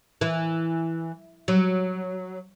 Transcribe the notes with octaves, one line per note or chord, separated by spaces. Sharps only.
E3
F#3